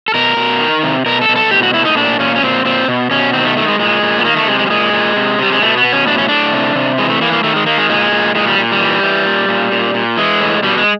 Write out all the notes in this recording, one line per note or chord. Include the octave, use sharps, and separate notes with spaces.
A4
B2 A#4
B2
D#3
C3
B2 A#4
A4
B2
A4
A2 G4
F#4
A2 E4
D#4
A#2 D4
A#2 C#4
C#4
A#2 C4
A#2 C4
B2
B2 C#4
D#3 C4
A3
D#3 A3
G#3
A#2 G#3
A#2
B3
D#3 A#3
A3
C3 G#3
G#3
G3
A#2 G#3
A#2
C3
C3 G3
G#3
B2 A3
B3
B2
C#4
A2 D4
C#4
A2 D4
C3
C3
E3 G#3
A3
E3 A#3
A#3
D#3 A3
G#3
D#3 A#3
G#3
A#2 G#3
A#2
A#2 G#3
G3
A#2
G3
E3
E3
A#2
A#2
A#2
A#2
E3 G#3
A2
B2 G3
G#3